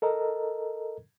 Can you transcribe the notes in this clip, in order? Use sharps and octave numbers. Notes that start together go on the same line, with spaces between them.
A4 A#4 D#5 A#5